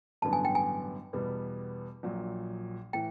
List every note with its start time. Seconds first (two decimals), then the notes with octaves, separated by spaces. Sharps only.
0.22 A1 G2 D3 F#3 B3 A5
0.33 G#5
0.45 G5
0.55 G#5
1.13 E2 B2 G3 B3
2.03 A#1 A#2 F#3
2.93 A2 E3 G5